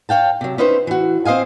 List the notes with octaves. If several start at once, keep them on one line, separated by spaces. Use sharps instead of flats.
C#5 F5 G5 A5
C3 F#3
C#4 D#4 E4 B4 C5 E5
E3 F#4
C4 C5 D#5 F5 G#5